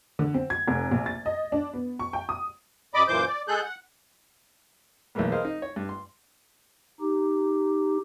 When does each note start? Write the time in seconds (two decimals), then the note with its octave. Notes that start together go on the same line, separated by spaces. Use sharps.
0.19 D3
0.34 C4
0.50 G#6
0.67 F1
0.91 A#1
1.06 A6
1.26 D#5
1.52 D4
1.74 B3
1.99 C#6
2.13 G5
2.29 D#6
2.94 F#2 D5 D#5 B5 D6
3.08 F#2 A#2 E3 C5 D6 G6
3.28 D5
3.48 G#3 G#4 A4 F#6 G6
3.63 F#5
5.15 B1 E3 G#3 A#3 B3
5.32 G#4 A#4 C5 D#5 F5
5.45 D#4
5.62 C#5
5.76 G2
5.89 C6
7.00 D#4 G4